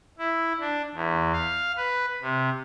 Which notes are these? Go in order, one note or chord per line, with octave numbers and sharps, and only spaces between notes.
E4
D4
E2
F5
B4
C3